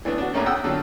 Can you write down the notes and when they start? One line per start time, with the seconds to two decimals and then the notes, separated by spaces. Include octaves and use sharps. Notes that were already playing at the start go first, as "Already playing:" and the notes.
0.05 E3 A3 B3 D4
0.18 D4 F#4
0.34 E2 A2 A3 A#3 C#4
0.46 F#5 G5 D#6 E6
0.64 D3 F#3 F4